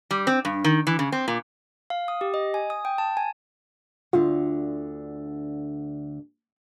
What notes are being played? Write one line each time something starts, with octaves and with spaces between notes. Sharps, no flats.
G3
C4
G2
D#3
E3
C#3
C4
A#2
F5
D#6
G4
D#5
G#5
D#6
G5
A5
G#5
D2 D3 F4